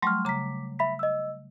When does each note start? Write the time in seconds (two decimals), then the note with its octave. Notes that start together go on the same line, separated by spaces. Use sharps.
0.02 F#3 G3 A3 C6 C#6 F6
0.25 C#3 A#5 D6 B6
0.79 E5 B5 B6
0.99 D#5 E6